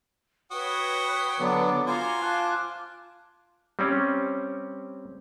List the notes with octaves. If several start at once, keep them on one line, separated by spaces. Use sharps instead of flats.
F#4 B4 C#5 G5 D#6
D3 F#3 B3 D4 D6
F4 F#4 C5 G#5 A#5 D6
F4 A5 D6 F#6
G3 C4 C#4